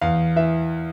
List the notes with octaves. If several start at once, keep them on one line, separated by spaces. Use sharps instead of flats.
E2 F5
E3 E5